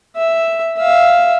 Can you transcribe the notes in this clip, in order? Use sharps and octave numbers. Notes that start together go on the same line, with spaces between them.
E5
E5 F5